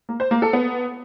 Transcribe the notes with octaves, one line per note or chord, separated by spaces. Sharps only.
A#3
C5
A#3
A4
B3